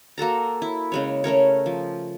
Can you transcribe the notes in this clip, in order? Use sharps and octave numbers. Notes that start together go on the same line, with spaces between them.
A#3 F#4 A4 A#5
E4
C#3 G#3 C#5
A3 C#4 A#4 C#5
F3